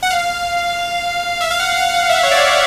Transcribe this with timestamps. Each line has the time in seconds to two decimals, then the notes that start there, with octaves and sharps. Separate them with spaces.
0.03 F#5
0.10 F5
1.41 E5
1.50 F5
1.59 F#5
1.77 F5
1.94 F#5
2.09 E5
2.23 C#5
2.31 D5